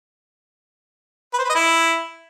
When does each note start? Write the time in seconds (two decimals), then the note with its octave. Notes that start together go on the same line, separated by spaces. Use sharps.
1.33 B4
1.39 C5
1.44 B4
1.49 D#5
1.55 E4